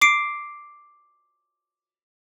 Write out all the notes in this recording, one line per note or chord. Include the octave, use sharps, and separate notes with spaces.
D6 C7 D7